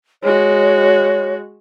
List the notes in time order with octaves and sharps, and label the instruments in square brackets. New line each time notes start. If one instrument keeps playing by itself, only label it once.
[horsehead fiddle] G#3 F#4 [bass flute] C#5